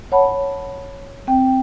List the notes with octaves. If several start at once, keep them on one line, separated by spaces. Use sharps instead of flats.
C#5 F#5 A5 B5
C4 G5